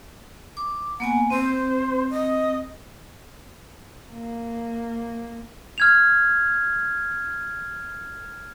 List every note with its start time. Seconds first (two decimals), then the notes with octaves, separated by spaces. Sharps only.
0.57 D6
1.00 A#3 B3 F#5 G#5
1.30 C4 C5
2.10 D#5
4.11 A#3
5.78 F6 G#6 F7